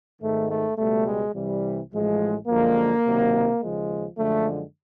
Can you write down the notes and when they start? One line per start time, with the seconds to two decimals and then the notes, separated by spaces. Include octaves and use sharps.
0.22 G#1 G#2 D#3 G#3 A3
0.50 A3
0.78 C#2 B2 G3 A3
1.06 G#3
1.35 C2 C3 E3 G3
1.92 A1 A2 F3 G#3
2.48 F#2 D3 F3 G#3 A#3
3.04 C#2 C3 D#3 F#3
3.61 D#2 C#3 F3 G#3
4.18 F#2 D3 F3 G#3 A3